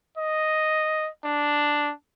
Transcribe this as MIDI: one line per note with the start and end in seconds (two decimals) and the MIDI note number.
0.18 1.09 75
1.25 1.91 62